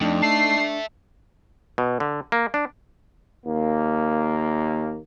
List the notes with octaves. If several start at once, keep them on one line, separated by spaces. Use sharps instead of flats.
F2 A3 D4 D#4
E5 A5 C7
B2
D3
A#3
D4
D#2 A#3